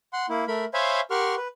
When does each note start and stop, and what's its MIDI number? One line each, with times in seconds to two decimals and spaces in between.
0.13 0.26 78
0.13 0.26 84
0.29 0.45 58
0.29 0.45 64
0.48 0.65 57
0.48 0.65 70
0.48 0.65 83
0.74 1.00 72
0.74 1.00 73
0.74 1.00 76
0.74 1.00 77
0.74 1.00 80
0.74 1.00 83
1.11 1.35 67
1.11 1.35 70
1.11 1.35 78
1.11 1.35 84
1.11 1.35 85
1.11 1.35 89
1.37 1.48 71